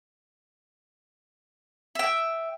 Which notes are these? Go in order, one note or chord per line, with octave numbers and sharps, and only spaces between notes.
E5 G5